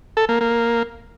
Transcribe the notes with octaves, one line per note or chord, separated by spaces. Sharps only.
A4
A#3
A#3